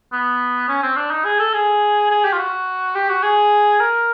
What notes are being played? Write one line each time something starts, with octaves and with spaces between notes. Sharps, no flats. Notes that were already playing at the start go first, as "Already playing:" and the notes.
B3
C#4
C4
D4
D#4
G#4
A4
G#4
G#4
G4
F4
F#4
G4
F#4
G#4
A#4